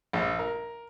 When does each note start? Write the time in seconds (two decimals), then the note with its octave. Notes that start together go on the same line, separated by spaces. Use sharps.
0.13 A#1
0.39 A#4